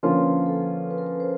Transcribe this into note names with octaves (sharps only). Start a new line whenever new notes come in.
D3 F3 A#3 C#4 F4 B4
A4
B4
A#4
B4
C5